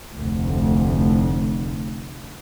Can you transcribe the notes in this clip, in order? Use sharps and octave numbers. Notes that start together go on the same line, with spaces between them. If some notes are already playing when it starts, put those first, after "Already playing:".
F1 D2